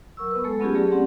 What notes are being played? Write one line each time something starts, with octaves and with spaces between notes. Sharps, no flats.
F#3 A#4 C#6 E6
B3 B4
G#3 A3 A4
F#3 B3 C#4 F4 G4 G#4
F#3 A3 G4 G#4 D5
C4 C#4 G4 F#5 C6